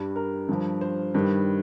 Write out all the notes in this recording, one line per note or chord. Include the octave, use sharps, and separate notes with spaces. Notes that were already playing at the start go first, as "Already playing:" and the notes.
Already playing: G2 G3
A#4
G2 F3
C5
G2 D#3 G3